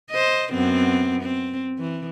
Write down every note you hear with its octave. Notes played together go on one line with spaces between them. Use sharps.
C5 D#5
F#2 B3 C4
C4
E3